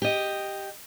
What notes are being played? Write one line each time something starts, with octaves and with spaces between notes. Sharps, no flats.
G4 D#5